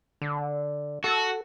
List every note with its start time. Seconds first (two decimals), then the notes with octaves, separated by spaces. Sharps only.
0.22 D3
1.04 F#4 A4